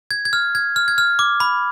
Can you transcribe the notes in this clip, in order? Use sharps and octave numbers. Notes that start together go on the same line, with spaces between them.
G#6
G#6
F6
G#6
F6
G#6
F6
D6
B5